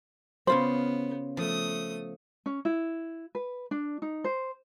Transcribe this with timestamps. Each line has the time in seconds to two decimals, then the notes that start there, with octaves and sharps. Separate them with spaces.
0.47 C#3 B3 F4 C5 B5
1.37 F3 A3 D#6
2.46 C#4
2.65 E4
3.35 B4
3.71 D4
4.02 D#4
4.24 C5